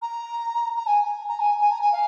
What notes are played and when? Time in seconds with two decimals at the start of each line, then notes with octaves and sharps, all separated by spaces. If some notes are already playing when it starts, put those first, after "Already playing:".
0.02 A#5
0.76 A#5
0.86 G#5
1.29 A#5
1.39 G#5
1.60 G#5
1.71 A#5
1.81 G#5
1.92 F5